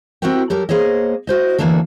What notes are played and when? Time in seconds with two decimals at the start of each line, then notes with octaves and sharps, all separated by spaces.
0.22 C4 E4 F#4 G4 A#4 G5
0.50 F#3 G4 A4 A#4
0.69 A#3 G#4 C5 C#5 D#5
1.27 E4 F#4 C5 D#5
1.58 D2 G2 E3 A#3 D4 A4